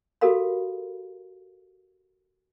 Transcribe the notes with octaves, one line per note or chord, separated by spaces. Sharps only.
F#4 G4 A4 A#4 F5 B5